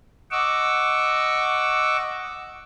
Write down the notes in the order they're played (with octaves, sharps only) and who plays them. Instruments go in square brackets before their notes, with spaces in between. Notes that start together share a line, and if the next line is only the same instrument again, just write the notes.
[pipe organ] D#5 F#5 C#6 D6 E6